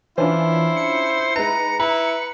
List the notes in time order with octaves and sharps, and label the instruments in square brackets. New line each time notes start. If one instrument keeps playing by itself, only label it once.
[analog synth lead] E3 [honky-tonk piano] C#4 D4 F4 [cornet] E4 [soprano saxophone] C5
[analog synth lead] C#7
[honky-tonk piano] G#3 D#4 B4 [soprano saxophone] A#5
[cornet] E4 [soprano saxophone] B4 [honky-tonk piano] A#5